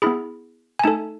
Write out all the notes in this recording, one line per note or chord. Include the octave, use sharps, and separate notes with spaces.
B3 E4 G#4 B5
G#5
A3 D#4 A4 A5